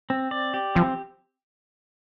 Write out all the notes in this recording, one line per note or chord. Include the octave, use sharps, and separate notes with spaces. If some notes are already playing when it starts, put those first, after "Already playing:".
C4
D5
G4
F3 C4